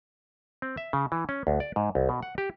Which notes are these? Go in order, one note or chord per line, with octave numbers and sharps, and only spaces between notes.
C4
E5
C#3
E3
C#4
D2
D5
G#2
C2
B2
F#5
G4